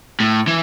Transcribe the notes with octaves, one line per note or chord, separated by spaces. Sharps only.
A2
E3